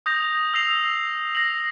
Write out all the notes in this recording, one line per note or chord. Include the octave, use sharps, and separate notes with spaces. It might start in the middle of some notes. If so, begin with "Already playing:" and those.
D#6 G6 A#6 F7
E6 A#6 C7 F7
A#6 C7 F7 F#7